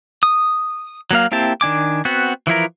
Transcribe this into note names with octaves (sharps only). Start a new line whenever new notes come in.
D#6
F#3 A#3 F5
A#3 C4 E4 G4 A5
D#3 D4 G#5 D6
B3 C4 F#4
E3 F3 E4 A#4